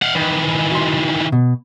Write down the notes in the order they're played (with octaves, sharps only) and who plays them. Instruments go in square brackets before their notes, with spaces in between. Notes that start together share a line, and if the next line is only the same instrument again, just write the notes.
[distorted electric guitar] F5 F#5
D#3 E3
[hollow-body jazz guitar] F#4 C6
B2